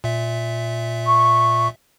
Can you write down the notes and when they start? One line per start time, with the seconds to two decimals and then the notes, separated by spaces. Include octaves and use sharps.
0.04 A#2 E5
1.07 C#6